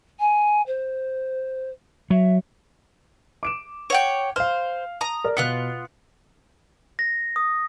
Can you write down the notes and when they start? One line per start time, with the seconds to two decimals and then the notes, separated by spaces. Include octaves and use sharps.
0.19 G#5
0.67 C5
2.10 F#3 E5
3.43 D6 D7 E7
3.90 C#5 F#5 G5
4.36 C5 F5 F6
5.01 A#5 D#6
5.24 A#4 D5
5.37 B2 B3 F4 F#6 C#7
6.99 A#6
7.36 D#6